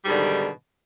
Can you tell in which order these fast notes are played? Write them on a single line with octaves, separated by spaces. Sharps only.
G3 G#2 B2 D3 D#3